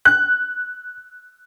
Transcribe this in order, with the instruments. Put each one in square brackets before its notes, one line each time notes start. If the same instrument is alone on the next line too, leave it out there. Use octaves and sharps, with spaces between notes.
[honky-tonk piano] F#6